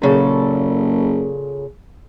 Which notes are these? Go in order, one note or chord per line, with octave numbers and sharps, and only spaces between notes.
F#1 A#2 C#3 A4